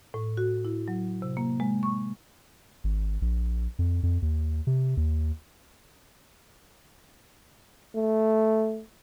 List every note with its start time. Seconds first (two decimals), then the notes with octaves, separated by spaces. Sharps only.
0.14 A2
0.37 F#4
0.65 E4
0.88 F#3
1.22 C3
1.37 A#3
1.60 G#3
1.83 C#6
2.84 G#1
3.22 A#1
3.79 F2
4.03 F2
4.22 D#2
4.67 C3
4.97 D#2
7.96 A3